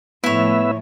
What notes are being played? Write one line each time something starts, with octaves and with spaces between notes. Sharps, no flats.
A2 F3 B3 E4 C#5 E5